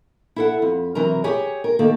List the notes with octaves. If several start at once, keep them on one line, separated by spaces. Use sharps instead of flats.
E4 A4 F#5
F2
C3 E3 F#3 A#4 A#5
G4 G#4 C#5
A#4
D#3 A#3 A4